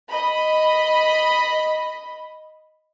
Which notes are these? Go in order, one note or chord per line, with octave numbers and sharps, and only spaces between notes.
D#5 B5